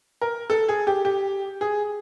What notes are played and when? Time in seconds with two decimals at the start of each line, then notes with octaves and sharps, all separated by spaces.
0.21 A#4
0.50 A4
0.68 G#4
0.87 G4
1.05 G4
1.61 G#4